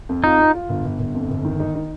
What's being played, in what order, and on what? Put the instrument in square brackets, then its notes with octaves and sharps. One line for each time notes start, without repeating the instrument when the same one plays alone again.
[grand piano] F2
[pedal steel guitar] D#4 [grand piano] F4
[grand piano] F4
F4
G1
G1
G1
F2
G1
D#3
D#4
D#4